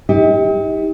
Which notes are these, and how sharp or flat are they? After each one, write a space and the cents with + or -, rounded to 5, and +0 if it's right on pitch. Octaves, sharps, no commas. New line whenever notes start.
D#4 +40 G4 +20